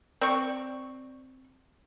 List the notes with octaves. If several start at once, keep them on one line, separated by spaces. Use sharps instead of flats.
C4 D5 C#6